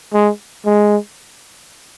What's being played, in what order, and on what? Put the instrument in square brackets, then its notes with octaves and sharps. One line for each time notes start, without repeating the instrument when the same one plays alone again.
[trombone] G#3
G#3